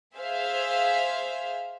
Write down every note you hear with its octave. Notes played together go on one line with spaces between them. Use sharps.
G#4 C5 E5 F5